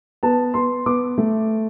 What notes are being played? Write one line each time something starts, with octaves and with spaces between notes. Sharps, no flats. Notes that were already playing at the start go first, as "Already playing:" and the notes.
B3 A5
B3 C6
B3 D6
A3